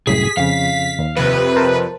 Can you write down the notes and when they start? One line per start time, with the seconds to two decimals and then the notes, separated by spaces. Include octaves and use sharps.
0.07 C2 F#2 A2 G#4 B6
0.37 F2 C#3 F5
0.99 D#2
1.16 F2 C3 B4
1.56 A#4 C5 A5